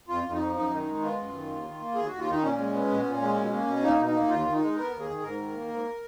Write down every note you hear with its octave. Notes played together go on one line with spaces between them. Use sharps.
F2 F4
F2
D#4
F3
F#2 D#4
D#3
D#4
G#3
B3 F4
F#2
D#3
D#2
D#3
A#3
D#2 G#4
D#2 F#4
F4
D#3 D#4
A#2 C#4
G#3
B3
A#2
A#2
G#3
B2
A#3
B2
A#3 D#4
B2
D#4
A#3
D#2 F4
D#3
D#4
G#3
B3 A#4
D#2
G#4
D#3
G#2 A#4
D#3
A#3
G#2